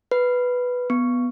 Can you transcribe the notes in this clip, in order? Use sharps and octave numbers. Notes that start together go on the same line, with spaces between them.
B4
B3